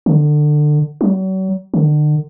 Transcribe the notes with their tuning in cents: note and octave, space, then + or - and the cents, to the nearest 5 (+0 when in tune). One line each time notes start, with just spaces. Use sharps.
D3 +25
F#3 +40
D3 +40